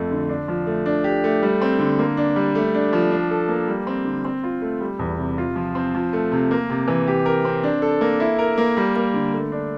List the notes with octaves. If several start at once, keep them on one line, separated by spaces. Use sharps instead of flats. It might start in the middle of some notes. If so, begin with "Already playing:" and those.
Already playing: F2 A3
D3
D4
F3
A3
D4
G4
A3
G3
C4
D3
A#3
D4
G3
A3
D4
F3
D4
A4
A#3
G3
C4
D3
C4
F4
A3
G3
E2
C3
F4
F3
C4
F3
A3
C3
A#3
C3
E3
G4
A#4
C4
D4
A4
A#3
E4
A#4
A#3
G3
A#3
D3
A3
D4